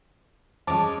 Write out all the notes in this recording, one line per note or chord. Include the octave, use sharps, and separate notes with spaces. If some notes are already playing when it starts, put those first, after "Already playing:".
G#3 C#4 C#5 A5 D6